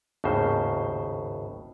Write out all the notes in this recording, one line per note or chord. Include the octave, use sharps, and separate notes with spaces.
G#1 D#2 A2 C#3 C5